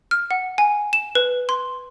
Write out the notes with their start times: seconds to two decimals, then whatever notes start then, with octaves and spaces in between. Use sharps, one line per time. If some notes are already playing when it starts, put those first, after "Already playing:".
0.11 F6
0.31 F#5
0.58 G#5
0.93 E7
1.15 B4
1.49 C6